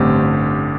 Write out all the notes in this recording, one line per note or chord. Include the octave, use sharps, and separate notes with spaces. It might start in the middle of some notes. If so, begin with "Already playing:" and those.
Already playing: A1 G2 D3 A3 C4 G4